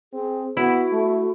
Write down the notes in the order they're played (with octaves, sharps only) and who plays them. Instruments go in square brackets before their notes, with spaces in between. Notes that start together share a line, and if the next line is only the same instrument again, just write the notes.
[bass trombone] C4 [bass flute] G#4
[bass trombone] B3 [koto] E4 [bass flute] F#4
[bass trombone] A3